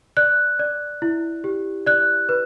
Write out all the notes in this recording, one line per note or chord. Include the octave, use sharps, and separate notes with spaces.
D5 F#6
D5
E4
G4
D5 F#6
B4